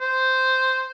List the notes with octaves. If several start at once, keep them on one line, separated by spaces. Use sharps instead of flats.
C5